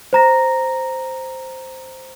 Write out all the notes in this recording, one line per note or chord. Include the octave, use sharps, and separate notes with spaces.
C5 A#5 A#6